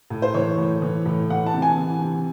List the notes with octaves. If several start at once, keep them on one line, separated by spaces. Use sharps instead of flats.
A2
C5
E3 C#5
A2
E3
A2
E3 F#5
A5
C3
G#5
E3
C3